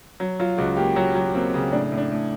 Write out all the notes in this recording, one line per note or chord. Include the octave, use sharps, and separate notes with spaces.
F#3
F#3 F4
C#2 F#4
A#3 G4
F#3 F#4
F#3
A#3 C4
C#3
A2 D4
A2
D4
A2